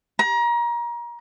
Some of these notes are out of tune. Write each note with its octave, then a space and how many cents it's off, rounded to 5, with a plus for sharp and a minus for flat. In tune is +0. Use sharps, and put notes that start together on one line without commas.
A#5 +30